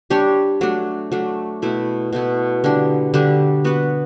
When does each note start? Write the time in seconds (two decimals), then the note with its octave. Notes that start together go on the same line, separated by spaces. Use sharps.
0.10 G3 D4 G4 C#5
0.61 F#3 A3 D4
1.12 F#3 A3 D4
1.62 B2 A3 E4
2.13 B2 A3 E4
2.64 D3 G3 D4
3.14 D3 G3 D4
3.64 B3 F#4 B4